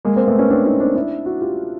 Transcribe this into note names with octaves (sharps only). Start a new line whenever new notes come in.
G#3 A#3
A#3 C4
A3 B3
B3 C#4
C4 D4
C#4 D#4
C4 D4
D4 E4
E4 F#4
F4 G4